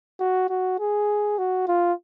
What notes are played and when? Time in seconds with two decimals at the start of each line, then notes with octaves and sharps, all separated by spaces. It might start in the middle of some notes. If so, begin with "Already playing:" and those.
0.20 F#4
0.50 F#4
0.80 G#4
1.38 F#4
1.68 F4